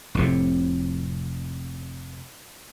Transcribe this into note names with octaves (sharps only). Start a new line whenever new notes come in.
F1 A2 C3